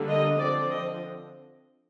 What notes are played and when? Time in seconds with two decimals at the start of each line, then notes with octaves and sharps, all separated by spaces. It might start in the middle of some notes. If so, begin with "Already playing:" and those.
Already playing: D3 G3 A#3
0.09 D#5
0.39 D3 F3 C4 D5
0.71 D#5